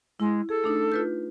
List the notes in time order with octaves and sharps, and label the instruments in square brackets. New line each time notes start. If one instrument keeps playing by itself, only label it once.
[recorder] G#3 [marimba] E4
[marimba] G#4 [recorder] A4
[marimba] A3 D4 D#4
F4 B4 G6